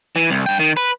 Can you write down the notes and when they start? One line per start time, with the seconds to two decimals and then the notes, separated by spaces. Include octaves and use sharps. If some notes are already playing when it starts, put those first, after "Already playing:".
0.16 E3
0.30 C2
0.46 G2 G5
0.60 D#3
0.77 B4